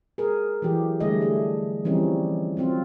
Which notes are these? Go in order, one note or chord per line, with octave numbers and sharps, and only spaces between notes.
G#4 A#4
E3 F#3 G4
D3 G3 A3 G#4 D#5
A3 G#4
E3 F3 G3 C4 C#4 D#4
F#3 C4 F4